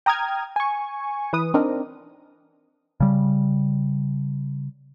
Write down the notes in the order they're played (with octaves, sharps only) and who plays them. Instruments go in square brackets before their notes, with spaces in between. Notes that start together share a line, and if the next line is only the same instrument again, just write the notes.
[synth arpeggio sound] G5 A#5 D#6 F6 G#6
G#5 C#6
E3 B4 D#6
C4 D4 D#4 A#4
[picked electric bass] C#3 G3